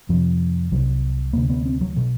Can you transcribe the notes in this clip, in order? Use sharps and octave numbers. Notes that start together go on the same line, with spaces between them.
F2 C3 F3
C2 C3 F#3
D2 C3 A#3
B3
C4
F#3
B2 F#3